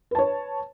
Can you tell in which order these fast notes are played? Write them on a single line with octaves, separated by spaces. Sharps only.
B4 A5 C#5